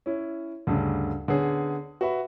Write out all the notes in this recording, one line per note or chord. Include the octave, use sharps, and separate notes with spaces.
C#4 E4
D2 G2 C#3
D3 B3 C#4 G#4
F#4 B4 E5 B5